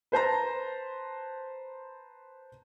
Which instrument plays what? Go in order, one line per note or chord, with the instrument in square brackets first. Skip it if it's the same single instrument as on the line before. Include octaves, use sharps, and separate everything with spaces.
[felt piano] B4 C5 A5 A#5